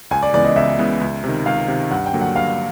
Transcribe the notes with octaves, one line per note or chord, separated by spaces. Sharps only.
C#2 G#5
D5
C#3 E3 G#3 B3 D5
D#5
C#2 E5
C#3 E3 G#3 B3
C#2
C3 D#3
C#2 F5
C3 D#3
G2 F#5
G5
D3 F#3 A#3
F#5
G2 F5